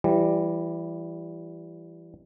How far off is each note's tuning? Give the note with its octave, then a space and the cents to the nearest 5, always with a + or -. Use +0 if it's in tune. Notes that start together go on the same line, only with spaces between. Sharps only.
E3 +25 G3 +0